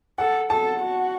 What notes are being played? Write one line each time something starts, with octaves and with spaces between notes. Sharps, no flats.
A4 F#5
A4 A5
F#4